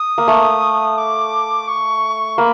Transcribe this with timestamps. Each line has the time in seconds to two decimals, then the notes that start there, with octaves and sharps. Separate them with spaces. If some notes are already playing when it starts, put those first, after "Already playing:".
Already playing: D#6
0.18 A#3
0.28 A3
0.98 D6
1.68 C#6
2.38 A#3 B5